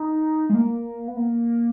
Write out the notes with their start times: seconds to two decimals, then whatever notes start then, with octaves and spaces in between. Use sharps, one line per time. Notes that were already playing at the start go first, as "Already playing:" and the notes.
Already playing: D#4
0.50 G#3
0.54 A#3
1.08 B3
1.17 A#3